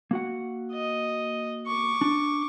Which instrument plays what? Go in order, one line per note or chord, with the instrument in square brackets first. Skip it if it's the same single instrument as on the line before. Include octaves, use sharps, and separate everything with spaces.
[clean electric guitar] A#3 F#4 F#5
[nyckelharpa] D#5
C#6 D6
[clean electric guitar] D4